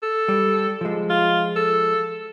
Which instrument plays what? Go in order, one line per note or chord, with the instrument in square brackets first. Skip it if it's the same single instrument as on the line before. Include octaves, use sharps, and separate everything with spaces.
[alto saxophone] A4
[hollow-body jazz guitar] G3
F3 G#3
[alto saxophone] F4
A4